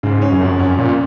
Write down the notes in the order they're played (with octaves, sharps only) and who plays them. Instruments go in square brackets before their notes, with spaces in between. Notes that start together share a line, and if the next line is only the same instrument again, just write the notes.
[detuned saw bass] G#2 [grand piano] C#3
[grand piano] C#4
[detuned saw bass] F#2
[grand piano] F2
[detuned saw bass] F#2 [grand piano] C#4
[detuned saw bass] A#2 [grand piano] C#4